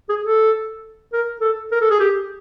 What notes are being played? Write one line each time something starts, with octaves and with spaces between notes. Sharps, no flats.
G#4
A4
A#4
A4
A#4
A4
G#4
G4